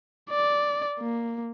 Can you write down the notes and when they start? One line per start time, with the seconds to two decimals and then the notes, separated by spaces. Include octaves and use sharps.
0.30 D5
0.99 A#3